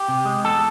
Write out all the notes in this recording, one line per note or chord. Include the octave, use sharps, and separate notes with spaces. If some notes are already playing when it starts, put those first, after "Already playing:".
Already playing: G4
C3
G#3
E2 A4